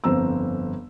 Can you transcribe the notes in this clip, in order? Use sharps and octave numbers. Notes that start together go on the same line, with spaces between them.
G1 F2 C4 A#5 E6